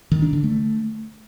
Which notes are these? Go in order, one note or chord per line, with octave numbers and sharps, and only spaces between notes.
D#3
D4
D3
A3